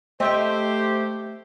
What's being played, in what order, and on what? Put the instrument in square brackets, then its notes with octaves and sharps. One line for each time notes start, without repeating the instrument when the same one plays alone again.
[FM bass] A3 [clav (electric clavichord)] C4 [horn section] G4 C5 [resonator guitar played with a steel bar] D#5 E5 G5